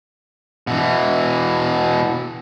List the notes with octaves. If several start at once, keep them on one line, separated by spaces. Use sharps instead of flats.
B2 E3